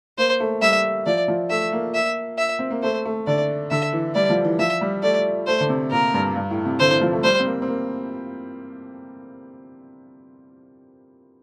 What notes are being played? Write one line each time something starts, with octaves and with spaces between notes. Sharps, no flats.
A#3 C5
A3
G3 E5
F3 D5
F3
A3 E5
A#3
E5
E5
C4
A#3
A3 C5
A3
D3 D5
D3 E5
E3
G3 D5
F3
E3
F3 E5
G3
A3 D5
A3 C5
D3
C3
A#2 A#4
G2
G2
A2
C3
D3 C5
E3
F3
A3
G3 C5
C4
A#3
C4
A#3